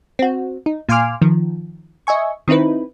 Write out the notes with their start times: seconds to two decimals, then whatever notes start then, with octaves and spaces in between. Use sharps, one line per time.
0.19 C4 F#4
0.66 D#4
0.89 A#2 F5 G#5 C6 D6 F6
1.21 D#3 F3
2.07 D#5 E5 G#5 C#6
2.48 D#3 C4 D#4 E4 B4